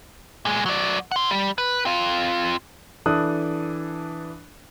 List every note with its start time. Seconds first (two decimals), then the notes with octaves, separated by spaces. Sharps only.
0.45 A#2 G#3
0.66 F#3 D5
1.11 F#5 C6
1.31 G3
1.58 B4
1.85 C4 F4
3.06 E3 D4 A4 D#6 F#6